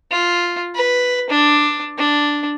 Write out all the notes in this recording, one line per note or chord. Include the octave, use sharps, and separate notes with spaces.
F4
B4
D4
D4